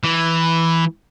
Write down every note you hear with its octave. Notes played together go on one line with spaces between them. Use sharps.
E3